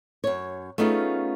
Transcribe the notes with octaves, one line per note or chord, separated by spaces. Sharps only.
F#2 C#5
A3 B3 C#4 D#4 F4 G#4